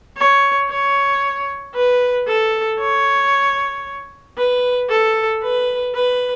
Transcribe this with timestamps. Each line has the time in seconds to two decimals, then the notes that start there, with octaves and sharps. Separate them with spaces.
0.18 C#5
0.70 C#5
1.74 B4
2.28 A4
2.80 C#5
4.38 B4
4.90 A4
5.43 B4
5.95 B4